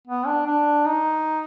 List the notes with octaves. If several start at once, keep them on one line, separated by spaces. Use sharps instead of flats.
B3
D4
D4
D#4